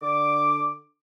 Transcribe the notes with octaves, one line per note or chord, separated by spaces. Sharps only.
D3 D6